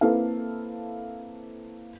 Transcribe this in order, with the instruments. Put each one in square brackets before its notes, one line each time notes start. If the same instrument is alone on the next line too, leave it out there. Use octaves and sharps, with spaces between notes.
[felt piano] A#3 C4 E4 A4 B4 F5